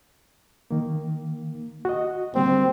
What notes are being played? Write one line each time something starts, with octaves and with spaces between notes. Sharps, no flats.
D#3 A#3
F#4 D#5
D3 G3 A#3 C4